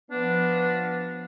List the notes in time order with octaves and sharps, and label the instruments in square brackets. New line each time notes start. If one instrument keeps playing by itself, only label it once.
[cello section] F3 F5 [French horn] B3 [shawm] D4